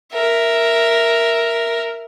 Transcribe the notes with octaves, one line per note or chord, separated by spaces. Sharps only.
A#4 E5